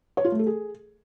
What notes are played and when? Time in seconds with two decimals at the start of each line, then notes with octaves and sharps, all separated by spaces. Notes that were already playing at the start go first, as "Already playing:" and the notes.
0.17 C#5
0.25 F4
0.32 A3
0.39 A4
0.47 G#4